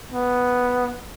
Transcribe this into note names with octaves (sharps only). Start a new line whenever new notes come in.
B3